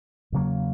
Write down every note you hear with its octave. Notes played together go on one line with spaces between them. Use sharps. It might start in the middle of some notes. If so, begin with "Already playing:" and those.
E2 C#3 F#3 A#3